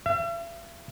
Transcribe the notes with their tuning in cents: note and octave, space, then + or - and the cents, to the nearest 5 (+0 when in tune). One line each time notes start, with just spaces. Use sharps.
E5 +45